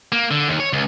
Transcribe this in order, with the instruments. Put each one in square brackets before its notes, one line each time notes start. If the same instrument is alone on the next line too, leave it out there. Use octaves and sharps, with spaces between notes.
[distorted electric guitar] A#3
D3
D#2
C#5
C#2